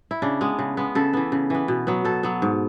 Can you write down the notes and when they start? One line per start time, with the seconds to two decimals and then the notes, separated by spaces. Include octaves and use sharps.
0.11 E4
0.22 C#3 D4
0.41 G#3 B3
0.59 C#3
0.77 G#3 B3
0.95 C#3 A4
1.13 E3 B3
1.32 C#3
1.50 E3 B3
1.68 B2
1.87 F#3 B3
2.05 B2 A4
2.23 F#3 B3
2.42 G#2